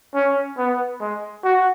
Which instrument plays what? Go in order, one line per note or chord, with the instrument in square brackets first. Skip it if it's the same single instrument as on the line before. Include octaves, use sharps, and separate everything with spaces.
[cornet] C#4
B3
G#3
F#4